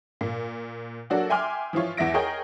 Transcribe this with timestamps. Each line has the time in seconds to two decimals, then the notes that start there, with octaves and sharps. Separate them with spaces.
0.21 A#2
1.10 F#3 A#3 D4 F#4 A4 D5
1.29 E5 G5 G#5 C6 D6 F6
1.73 E3 F3 E4 F4 C#5
1.97 E2 E3 E5 A#6 D7
2.14 G#4 A#4 C#5 D#5 G5